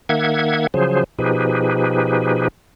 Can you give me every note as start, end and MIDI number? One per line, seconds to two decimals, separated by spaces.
0.09 0.67 51
0.09 0.67 58
0.09 0.67 76
0.09 0.67 78
0.09 0.67 92
0.74 1.04 49
0.74 1.04 53
0.74 1.04 54
0.74 1.04 68
0.74 1.04 72
1.19 2.48 47
1.19 2.48 53
1.19 2.48 63
1.19 2.48 67
1.19 2.48 68
1.19 2.48 71